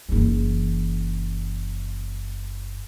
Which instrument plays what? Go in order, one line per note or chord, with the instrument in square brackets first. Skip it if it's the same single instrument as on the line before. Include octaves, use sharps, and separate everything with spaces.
[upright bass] F#1 E3